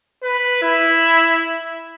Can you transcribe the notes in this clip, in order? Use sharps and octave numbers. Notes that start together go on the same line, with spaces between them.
B4
E4